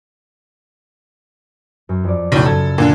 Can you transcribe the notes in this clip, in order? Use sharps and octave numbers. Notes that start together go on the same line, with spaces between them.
F#2
F2 D5
B1 A2 C#3
F#2 A4 G#6 E7
A#2 D3 D4 A#5